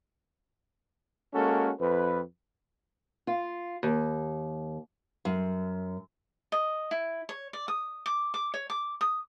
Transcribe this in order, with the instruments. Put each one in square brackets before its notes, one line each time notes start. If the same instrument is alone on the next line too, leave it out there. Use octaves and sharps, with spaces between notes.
[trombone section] G#3 A#3 C#4 F#4 A4
F2 B4
[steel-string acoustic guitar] F4
D#2
F#2
[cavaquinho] D#5
E4
C#5
D5
D#6
D6
D6
C#5
D6
D#6